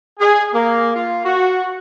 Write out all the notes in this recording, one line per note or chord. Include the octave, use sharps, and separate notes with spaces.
G#4
A#3
F4
F#4